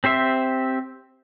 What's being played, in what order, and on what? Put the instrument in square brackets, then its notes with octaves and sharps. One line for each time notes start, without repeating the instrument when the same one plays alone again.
[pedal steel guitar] C4 G4 C5 E5